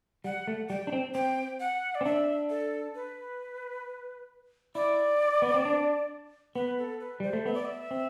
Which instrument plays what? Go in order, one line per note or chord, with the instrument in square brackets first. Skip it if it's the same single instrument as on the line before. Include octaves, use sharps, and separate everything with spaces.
[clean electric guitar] G3 [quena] F#5
[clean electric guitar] A3
[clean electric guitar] G3 [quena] G5
[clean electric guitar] D4
C4
[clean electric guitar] C4 [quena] G5
[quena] F#5
D5
[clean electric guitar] C4
[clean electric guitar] D4 [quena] E5
[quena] A4
B4
[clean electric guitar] E4 [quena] D5
[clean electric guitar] B3
C4
D4
[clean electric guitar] B3 [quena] B4
[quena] A4
B4
[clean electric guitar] G3 [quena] C5
[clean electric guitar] A3
[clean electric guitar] B3 [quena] E5
[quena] D5
E5
[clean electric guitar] C4